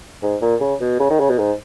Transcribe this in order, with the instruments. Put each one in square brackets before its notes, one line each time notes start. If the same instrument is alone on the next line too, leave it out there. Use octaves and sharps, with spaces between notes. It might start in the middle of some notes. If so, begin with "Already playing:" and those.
[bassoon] G#2
A#2
C#3
B2
C#3
D#3
C#3
B2
G#2